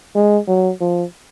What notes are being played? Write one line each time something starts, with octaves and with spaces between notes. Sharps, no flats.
G#3
F#3
F3